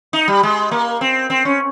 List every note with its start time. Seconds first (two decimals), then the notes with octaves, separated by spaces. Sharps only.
0.13 D#4
0.28 G3
0.43 G#3
0.71 A#3
1.01 C4
1.30 C4
1.45 C#4